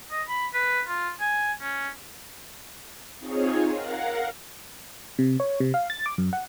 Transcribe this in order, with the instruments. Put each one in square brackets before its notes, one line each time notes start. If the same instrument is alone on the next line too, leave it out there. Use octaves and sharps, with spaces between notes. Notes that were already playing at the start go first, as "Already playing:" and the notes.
[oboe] D#5
B5
B4
F4
G#5
C#4
[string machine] C4 D#4 F4 G#4 C#5
A#4 F5 F#5
[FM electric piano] C3
C#5
C3
F5
A6
D6
F#2
F#5